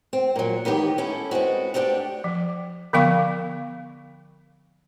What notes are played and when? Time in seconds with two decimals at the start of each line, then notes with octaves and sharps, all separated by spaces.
0.13 C4
0.36 A#2 F#3
0.65 D#3 E3 B3 G4
0.98 C#4 E4 A4
1.31 G#3 B3 C4 F#4
1.74 A3 B3 C4 D4 F#4 G4
2.24 F3
2.93 D3 F3 B3 F5 C#6